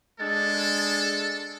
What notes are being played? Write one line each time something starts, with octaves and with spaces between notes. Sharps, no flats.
G#3 D4 A4 A6